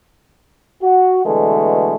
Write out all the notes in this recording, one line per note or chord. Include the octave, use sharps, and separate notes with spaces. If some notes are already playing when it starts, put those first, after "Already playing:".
F#4
B2 D3 E3 G#3 A3